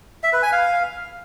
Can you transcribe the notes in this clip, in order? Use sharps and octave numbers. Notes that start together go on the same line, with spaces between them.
E5
B4
G#5
F5